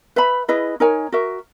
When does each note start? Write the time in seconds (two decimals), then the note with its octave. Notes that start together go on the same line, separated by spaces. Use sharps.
0.16 B4 E5 B5
0.48 E4 G#4 B4 D#5
0.80 D#4 A#4 C#5 G#5
1.12 F#4 A#4 E5